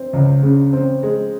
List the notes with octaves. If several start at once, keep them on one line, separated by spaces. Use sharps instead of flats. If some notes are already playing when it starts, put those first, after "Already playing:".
Already playing: C4
C#2
C#3
C4
G#3